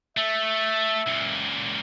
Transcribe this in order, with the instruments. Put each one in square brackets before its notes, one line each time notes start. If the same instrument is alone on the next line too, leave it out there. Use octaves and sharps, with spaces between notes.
[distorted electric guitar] A3 [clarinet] E5
[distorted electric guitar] C#2 A#2